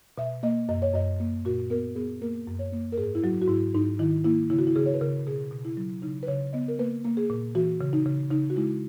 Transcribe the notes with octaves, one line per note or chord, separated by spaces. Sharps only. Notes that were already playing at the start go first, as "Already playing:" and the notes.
B2 E5
A#3 D#5
F#2 D#5
C#5
F#2 D#5
A#3
A#2 F#4
B3 A#4
B3 G#4
A#3 A#4
F#2
C#5
A#3
A#4
G#2 G#4
E4
F#3 F#4
F#4
G#2 E4
G#2 D#4
D#3 E4
A#3 E4
C#3 E4
F#4
E4
C#3 G#4
C#5
B4
C#3 A#4
B2 G#4
B2
E4
F#3
C#3 D#4
B4
C#3 C#5
B3 D#5
A#4
A#3 B4
A#3
G#4
A#2
E3 F#4
C#3
D#4
C#3
C#3 D#4
F#4
G#3 E4